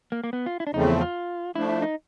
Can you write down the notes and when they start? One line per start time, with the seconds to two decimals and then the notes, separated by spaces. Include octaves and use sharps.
0.12 A#3
0.24 A#3
0.33 B3
0.46 F4
0.60 E4
0.67 D4
0.74 E2 C#3 F3 A3 C4 D#4
0.87 E4
1.01 F4
1.56 F3 A3 D4 E4
1.69 E4
1.82 D#4